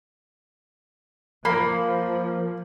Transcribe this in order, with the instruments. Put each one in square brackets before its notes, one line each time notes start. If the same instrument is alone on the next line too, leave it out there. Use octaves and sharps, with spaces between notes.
[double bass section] F3 [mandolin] A#3 [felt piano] B5